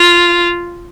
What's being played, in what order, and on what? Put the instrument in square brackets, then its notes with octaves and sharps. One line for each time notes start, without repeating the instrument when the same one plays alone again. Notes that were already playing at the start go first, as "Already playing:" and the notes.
Already playing: [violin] F4